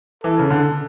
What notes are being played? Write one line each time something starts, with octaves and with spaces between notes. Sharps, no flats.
E3 A4
C#3
D3